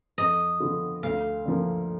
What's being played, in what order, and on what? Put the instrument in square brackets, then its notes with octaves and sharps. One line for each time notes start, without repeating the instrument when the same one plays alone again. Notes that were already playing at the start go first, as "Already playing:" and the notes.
[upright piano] F2 [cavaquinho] D#5
[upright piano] D3 F3 B3 F4
[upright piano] D2 [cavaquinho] F5
[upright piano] D3 F3 A#3